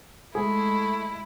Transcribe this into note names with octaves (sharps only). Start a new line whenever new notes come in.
G#3 A3 E4 G#4